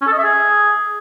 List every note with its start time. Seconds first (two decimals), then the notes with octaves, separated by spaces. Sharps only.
0.01 C#4
0.07 A4
0.12 D#5
0.18 E5
0.24 G#4